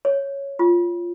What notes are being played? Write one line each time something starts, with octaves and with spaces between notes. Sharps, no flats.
C#5
F4